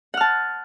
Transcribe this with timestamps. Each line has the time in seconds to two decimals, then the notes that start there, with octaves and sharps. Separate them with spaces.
0.14 F#5
0.17 F6
0.21 A5